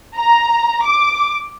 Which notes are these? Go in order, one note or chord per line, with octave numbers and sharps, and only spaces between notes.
A#5
D6